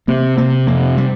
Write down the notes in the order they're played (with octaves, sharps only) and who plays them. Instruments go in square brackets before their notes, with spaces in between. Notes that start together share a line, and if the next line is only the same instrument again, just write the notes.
[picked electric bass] C3 [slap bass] A#3
[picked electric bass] C3 [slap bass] A#3
[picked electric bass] F2 [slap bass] A#3
[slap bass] G3